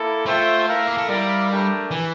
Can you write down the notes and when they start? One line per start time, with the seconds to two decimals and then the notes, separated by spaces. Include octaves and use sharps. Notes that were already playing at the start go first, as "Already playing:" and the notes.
Already playing: A#3 E4 A4
0.26 A3 F4 C5 E5 G5
0.67 E4 A#4 F5
0.87 A#3
0.98 A3
1.08 G3 E4 A#4 D5 F5
1.49 A3 D4 G4 A#4
1.91 E3